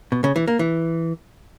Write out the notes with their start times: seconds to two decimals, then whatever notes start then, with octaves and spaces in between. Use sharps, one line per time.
0.12 B2
0.24 C#3
0.36 E3
0.48 A#3
0.59 E3